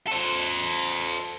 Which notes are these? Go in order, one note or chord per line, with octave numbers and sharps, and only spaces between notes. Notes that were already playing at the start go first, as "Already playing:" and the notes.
A4 C5